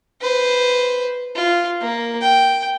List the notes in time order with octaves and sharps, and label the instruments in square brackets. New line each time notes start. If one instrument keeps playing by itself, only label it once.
[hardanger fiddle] B4 C5
F4
A#3
G5